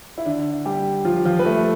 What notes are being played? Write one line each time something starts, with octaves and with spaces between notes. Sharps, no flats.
E4
D3 D4
G3 G4
F3 F4
F3 F4
B4
A3 A4